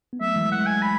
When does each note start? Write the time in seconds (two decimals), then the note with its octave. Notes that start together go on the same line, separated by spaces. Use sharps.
0.13 B3
0.21 F#3 A3 E5
0.36 E3 G#3
0.52 E3 G#3 F#5
0.66 G#5
0.82 B5